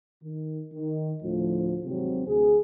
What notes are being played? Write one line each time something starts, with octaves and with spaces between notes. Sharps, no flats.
D#3
D#3
D2 A2 F3
G#1 C3 F#3 C4
D2 G#4